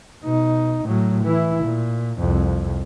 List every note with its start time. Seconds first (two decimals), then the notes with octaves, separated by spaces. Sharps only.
0.25 B2 D#4
0.85 A2 F#3
1.23 E3 E4
1.63 A#2
2.18 C2 F2